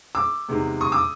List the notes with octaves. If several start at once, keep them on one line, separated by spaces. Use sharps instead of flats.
D6 E6
E2 C3 D#3 G#3
C#6 D#6
D6 E6
D#6